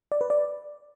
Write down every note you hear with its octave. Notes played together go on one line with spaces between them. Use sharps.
D5
B4
D5